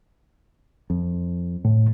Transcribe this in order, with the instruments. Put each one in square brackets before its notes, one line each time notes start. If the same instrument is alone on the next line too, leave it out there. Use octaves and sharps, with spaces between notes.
[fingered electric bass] F2
[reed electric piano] A2